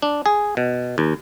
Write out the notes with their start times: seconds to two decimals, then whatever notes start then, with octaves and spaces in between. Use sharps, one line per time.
0.02 D4
0.26 G#4
0.57 B2
0.98 D#2